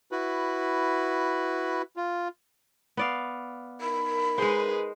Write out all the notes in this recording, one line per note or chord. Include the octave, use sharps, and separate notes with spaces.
E4 F#4 B4
F4
B3 D5 F5
D#4 A#4 B5
G#3 G#4 B4 C5